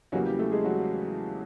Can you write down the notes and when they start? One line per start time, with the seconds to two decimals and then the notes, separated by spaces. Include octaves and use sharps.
0.12 E2 C#3 E3 F#3 G3 A#3 F#4
0.26 G3 G4
0.39 A3 A4
0.51 G#3 G#4
0.64 F#3 F#4